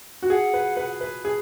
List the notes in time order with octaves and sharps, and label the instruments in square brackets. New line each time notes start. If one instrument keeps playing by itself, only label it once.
[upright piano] F#4
[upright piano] G#4 [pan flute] F#5
[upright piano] B4
B4
B4
G#4